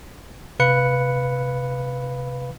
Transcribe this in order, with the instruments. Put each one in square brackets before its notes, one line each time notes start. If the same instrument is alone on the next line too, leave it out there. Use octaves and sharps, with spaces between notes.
[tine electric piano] C3 B4 F5 B5 F#6 C#7